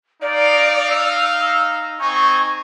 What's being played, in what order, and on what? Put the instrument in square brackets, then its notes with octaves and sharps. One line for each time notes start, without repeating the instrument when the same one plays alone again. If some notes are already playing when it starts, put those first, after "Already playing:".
[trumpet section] D#4 F5 [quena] D5
[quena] E6
E6
[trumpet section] C4 D#4 G#5 [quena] C#6